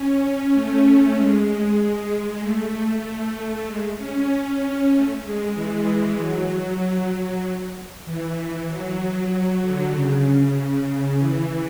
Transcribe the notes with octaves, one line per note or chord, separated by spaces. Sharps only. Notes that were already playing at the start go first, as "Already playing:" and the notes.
Already playing: C#4
A3
G#3
A3
A3
G#3
C#4
A3
G#3
E3
F#3
E3
F#3
F#3
D3
C#3
E3